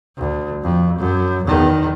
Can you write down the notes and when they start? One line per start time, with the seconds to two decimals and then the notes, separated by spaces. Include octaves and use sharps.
0.17 D2
0.63 F2
0.98 F#2
1.45 E2 D#3